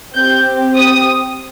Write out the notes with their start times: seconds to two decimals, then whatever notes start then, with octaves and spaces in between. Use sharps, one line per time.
0.15 C4 G4 G6
0.76 D#6